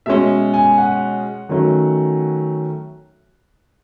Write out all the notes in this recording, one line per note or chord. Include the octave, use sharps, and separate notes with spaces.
B2 G#3 C#4 E5
G#5
F#5
D#3 F#3 A3 C#4